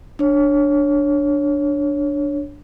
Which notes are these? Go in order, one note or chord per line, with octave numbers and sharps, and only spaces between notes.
D4 C#5